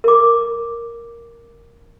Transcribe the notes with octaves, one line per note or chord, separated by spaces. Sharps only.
A#4 D6